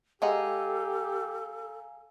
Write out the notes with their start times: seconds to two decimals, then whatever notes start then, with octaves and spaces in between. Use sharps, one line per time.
0.22 G#3 G4 A4 D#5 F5 F#5 G#5 A#5